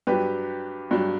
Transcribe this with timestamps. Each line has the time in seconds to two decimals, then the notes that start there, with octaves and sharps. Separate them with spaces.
0.07 G2 F#3 G4 B4
0.91 G2 F#3